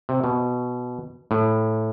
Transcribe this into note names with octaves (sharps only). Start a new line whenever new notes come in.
C3
B2
A2